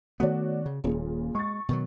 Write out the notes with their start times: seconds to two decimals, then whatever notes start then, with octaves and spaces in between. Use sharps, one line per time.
0.20 D#3 A3 B3 F#4 C#5 D5
0.66 C#3
0.84 D#1 A#2 C#3
1.35 G#3 C#6 A6
1.69 B2 D#3 F#3